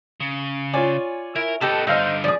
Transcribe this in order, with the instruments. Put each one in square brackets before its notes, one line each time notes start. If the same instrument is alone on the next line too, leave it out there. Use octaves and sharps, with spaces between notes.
[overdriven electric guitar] C#3
[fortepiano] F4 C#5 G#5 [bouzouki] D5
[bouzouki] E4 [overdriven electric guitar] A#4
[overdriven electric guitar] B3 A5 [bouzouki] D#4 A4 B4 [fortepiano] G4
[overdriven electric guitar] G2 D3 [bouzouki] D#4 C5 [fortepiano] D#5 F5 E6
[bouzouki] F3 G#4 [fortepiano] D5 D#6